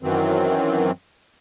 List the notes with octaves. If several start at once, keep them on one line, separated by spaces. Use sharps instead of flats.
F#2 D#3 E3 F#3 C4